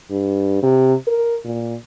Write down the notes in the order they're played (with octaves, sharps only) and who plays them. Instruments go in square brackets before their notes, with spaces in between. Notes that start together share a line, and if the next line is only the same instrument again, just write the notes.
[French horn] G2
C3
A#4
A#2